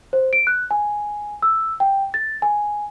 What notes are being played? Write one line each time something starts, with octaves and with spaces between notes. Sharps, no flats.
C5
D7
F#6
G#5
E6
G5
A6
G#5